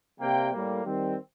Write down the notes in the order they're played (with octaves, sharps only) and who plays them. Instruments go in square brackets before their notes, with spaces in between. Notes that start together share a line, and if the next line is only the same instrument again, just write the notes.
[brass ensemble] C3 G3 A#3 G5
A2 G3 A#3
D#3 G3 C4